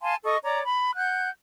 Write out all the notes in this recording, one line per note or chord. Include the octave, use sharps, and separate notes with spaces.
F5 G#5 A5 C6
A4 D#5 C#6 D#6
C#5 D5 A#5 D6
B5
F#5 F#6 G6